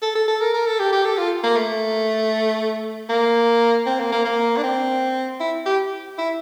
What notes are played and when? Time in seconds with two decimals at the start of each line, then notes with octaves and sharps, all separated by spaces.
0.02 A4
0.15 A4
0.28 A4
0.41 A#4
0.54 A#4
0.67 A4
0.79 G4
0.92 G4
1.05 A4
1.18 F4
1.43 A#3
1.56 A3
3.10 A#3
3.86 C4
4.00 A#3
4.12 A#3
4.25 A#3
4.57 D4
4.64 C4
5.40 E4
5.66 G4
6.18 E4